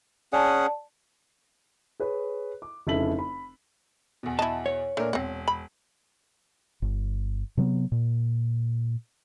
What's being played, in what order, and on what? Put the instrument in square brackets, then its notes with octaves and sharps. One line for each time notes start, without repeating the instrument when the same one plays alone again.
[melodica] C#4 G#4 F#5 [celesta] D5 A5
[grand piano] G#4 B4 C#5
D6
F1 C#3 E4 A4 B6 F#7
B5
E2 B2
[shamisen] E4 D#5 [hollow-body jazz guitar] A5
[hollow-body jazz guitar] C#5
[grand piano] A#2 D4 A#4 [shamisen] A3
[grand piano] E1 [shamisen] C4 F#5
[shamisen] B5
[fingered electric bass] G1
C3 F#3 G#3 B3
A#2